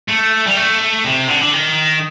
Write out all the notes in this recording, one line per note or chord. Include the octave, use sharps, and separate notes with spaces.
A3
G3
A3
C3
D3
D3
D#3